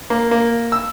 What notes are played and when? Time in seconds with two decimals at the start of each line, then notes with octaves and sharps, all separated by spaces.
0.10 A#3
0.31 A#3
0.72 E6